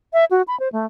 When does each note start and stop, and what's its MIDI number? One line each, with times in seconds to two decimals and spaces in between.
0.13 0.25 76
0.31 0.42 66
0.48 0.58 83
0.60 0.68 72
0.72 0.86 57